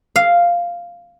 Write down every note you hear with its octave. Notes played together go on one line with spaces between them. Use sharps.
F5